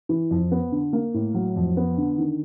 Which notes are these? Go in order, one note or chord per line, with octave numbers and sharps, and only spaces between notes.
E3
F2
B3
D3
A#3
A2
F#3
F2
B3
D3
D#3